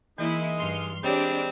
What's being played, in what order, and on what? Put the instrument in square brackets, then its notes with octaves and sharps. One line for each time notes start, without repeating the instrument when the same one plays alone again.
[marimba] E3 [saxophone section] G#3 D#4 D#5 [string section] A#3 E4
[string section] G2 C6 F6
[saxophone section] G3 G#3 C4 [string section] D4 D5 [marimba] G4 C#5